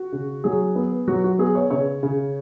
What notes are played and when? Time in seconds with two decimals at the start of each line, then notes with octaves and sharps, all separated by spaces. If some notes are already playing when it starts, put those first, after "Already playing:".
Already playing: F#4
0.12 C#3
0.44 F#3 G#4
0.76 B3
1.08 F#3 F#4
1.24 F#4
1.39 B3 G#4
1.55 C#5
1.70 C#3 C#5
2.03 C#3